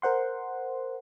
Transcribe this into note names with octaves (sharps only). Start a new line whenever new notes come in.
A#4 C5 F#5 C6